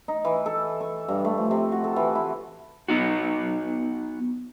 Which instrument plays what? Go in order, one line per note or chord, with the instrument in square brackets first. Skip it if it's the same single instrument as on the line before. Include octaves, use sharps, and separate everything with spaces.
[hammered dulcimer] D#4
E3
A4
C#6
G2
A3
F3
C3
F#4
A4
E3
E4
[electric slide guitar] B3 D#4 F#4